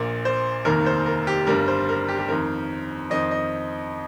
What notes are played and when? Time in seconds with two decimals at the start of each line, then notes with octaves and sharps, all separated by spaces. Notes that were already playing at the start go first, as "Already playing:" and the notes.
Already playing: A#1 A#2 A#3
0.25 C5
0.65 F1 D#2 D#3 A#3 A#4
0.86 C5
1.06 A#4
1.27 G4
1.47 G1 G2 G3 A#4
1.68 C5
1.89 A#4
2.08 G4
2.19 G4
2.28 F2 D#3 C4 A#4
3.10 F2 D#3 C4 D#5
3.31 D#5